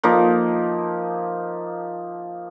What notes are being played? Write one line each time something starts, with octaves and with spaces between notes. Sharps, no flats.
F3 A#3 D#4